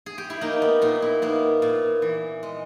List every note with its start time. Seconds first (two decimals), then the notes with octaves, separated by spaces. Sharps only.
0.06 G#4
0.18 G4
0.30 E4
0.41 A#3 D#4
0.62 B3
0.82 A#2 D#4
1.02 E4
1.22 A#3 B3
1.62 A#2
2.02 E3
2.43 G#3